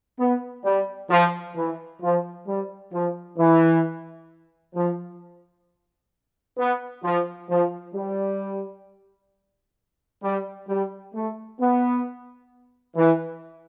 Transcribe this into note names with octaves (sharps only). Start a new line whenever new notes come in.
B3
G3
F3
E3
F3
G3
F3
E3
F3
B3
F3
F3
G3
G3
G3
A3
B3
E3